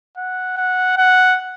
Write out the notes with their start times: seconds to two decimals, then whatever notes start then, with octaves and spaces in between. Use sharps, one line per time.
0.17 F#5
0.57 F#5
0.97 F#5